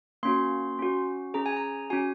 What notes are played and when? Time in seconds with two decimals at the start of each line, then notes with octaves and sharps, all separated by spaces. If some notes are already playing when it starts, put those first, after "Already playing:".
0.23 A#3 C#4 F#4 C6
0.79 C#4 F#4
1.34 C#4 G#4 A#5
1.46 G#5
1.57 A#5
1.90 C#4 F#4 G#5